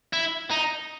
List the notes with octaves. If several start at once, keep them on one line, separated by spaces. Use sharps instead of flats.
E4
D#4